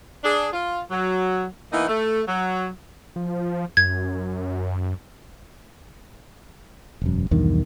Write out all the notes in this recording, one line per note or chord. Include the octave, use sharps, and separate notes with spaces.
D4 G#4
F4
F#3
E3 A#3 B3 D#4
A3
F#3
F3
F#2 G#6
E1 F#2
B1 E2 G2 D#3